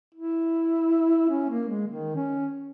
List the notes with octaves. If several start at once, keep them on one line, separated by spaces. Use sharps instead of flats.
E4
C#4
A#3
G#3
D#3
C#4